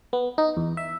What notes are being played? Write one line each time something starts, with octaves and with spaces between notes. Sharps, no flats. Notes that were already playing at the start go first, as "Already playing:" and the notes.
B3
D#4
E2
E5